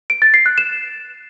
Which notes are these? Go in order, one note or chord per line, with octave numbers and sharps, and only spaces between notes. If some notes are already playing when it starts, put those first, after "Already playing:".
D7
A6
C7
F#6
E7